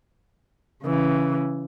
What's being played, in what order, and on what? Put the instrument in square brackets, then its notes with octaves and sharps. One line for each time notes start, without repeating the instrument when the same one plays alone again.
[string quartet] C#3 E3